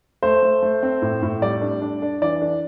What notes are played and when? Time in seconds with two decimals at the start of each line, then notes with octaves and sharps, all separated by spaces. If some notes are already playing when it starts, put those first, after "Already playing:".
0.23 A3 C5
0.42 A3
0.62 A3
0.83 C4
1.02 A2
1.23 A2
1.42 G3 D5
1.61 D4
1.82 D4
2.02 D4
2.22 E3 D5
2.41 D4